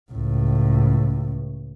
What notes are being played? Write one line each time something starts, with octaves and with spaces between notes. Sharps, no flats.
C#2 A2